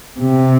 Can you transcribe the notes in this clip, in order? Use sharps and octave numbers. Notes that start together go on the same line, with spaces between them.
C3